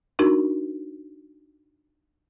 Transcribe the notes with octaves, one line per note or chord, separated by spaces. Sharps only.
D4 D#4 F#4 A#4